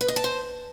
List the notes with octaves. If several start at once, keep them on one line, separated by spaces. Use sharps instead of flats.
B4
D#5
A5
C5